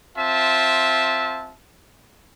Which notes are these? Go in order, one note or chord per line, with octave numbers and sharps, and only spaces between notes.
C4 F4 E5 A5